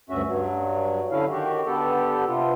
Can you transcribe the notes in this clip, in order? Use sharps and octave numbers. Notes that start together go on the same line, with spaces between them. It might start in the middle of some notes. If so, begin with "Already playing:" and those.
D2 G2 C#4 F#4 E5
G2 F#3
D3 C#4 E4 F5
D#3 F#4 G4
D3 B3 G4 A4
C3 B3 F4